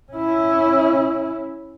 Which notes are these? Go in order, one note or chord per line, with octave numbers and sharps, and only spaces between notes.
C#4 E4